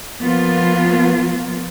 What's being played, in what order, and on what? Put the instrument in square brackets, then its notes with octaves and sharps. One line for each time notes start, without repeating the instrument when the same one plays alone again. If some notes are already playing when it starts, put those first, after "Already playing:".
[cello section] F3 A#3 B3 F4